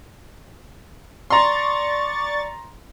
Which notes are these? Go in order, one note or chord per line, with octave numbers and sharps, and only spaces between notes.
D5 A#5 C6 C#6 A6